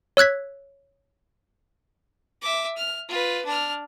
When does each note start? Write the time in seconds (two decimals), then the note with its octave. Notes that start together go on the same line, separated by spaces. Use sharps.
0.17 C#5 E6 F#6 G#6 B6
2.42 E5 D6
2.77 F6
3.09 F4 B4
3.46 D4 F6